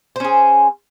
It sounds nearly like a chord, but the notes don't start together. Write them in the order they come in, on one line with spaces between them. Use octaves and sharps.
C5 C#4 G#4